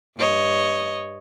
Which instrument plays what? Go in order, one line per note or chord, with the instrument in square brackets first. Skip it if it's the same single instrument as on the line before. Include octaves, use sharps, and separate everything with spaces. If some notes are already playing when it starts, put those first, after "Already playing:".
[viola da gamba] G2 C#5 D#5